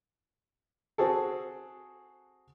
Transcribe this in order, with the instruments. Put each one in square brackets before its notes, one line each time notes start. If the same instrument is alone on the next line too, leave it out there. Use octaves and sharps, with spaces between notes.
[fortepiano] C4 F#4 G#4 A4